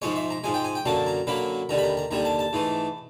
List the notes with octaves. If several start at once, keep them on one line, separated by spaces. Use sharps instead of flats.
G#2 F3 G#3 C#5
E5
A#5
G#2 F3 G#3 G#5
G5
G#5
G5
F#2 D3 F#3 A#3 A5
A#5
F#2 D3 F#3 A#3 B5
D#2 D3 G3 A#5
B5
A#5
A#5
D#2 D3 G3 A#5
A5
A5
G#2 E3 A3